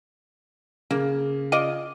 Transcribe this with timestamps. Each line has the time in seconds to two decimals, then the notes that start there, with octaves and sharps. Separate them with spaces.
0.91 C#3 A#3
1.52 F4 D5 D#5